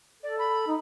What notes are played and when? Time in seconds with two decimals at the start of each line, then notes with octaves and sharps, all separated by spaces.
0.23 A4 D5
0.39 B5
0.68 D#4